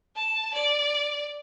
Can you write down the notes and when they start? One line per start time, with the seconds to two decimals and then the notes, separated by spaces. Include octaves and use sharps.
0.16 A5
0.53 D5